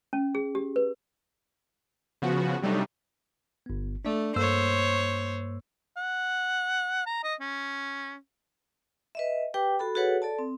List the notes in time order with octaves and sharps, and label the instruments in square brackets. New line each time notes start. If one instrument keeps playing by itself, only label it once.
[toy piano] C#4
G#4
G4
B4
[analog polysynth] C#3 F3 B3 F#4
C3 F#3 G3 A3 D4 D#4
[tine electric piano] G1 B3
[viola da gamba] A3 [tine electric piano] D4 D5
[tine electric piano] G2 A#3 E6 [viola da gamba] C5 C#5
[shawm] F#5
A#5
D#5
C#4
[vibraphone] B4 D#5 E5
G4 B4 G5 D6
F#4 A4 B5
F#4 G#4 A4 B4 C#5 F#5
A4 D5 A5
C4